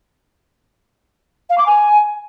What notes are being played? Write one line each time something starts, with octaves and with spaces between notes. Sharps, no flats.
F5
D6
G#5